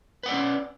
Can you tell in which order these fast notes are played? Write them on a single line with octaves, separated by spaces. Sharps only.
B4 F#5 D5 C#4